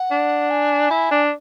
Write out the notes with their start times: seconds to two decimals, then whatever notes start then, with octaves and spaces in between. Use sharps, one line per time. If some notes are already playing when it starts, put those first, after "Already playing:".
Already playing: F#5
0.11 D4
0.51 G#5
0.90 E4
1.11 D4